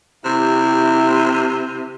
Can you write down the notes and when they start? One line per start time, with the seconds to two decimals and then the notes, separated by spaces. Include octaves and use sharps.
0.25 C3 E4 G4